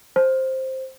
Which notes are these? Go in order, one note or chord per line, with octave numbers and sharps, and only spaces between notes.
C5